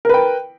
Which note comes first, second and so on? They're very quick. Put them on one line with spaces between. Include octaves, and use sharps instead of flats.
A#4 B4 G5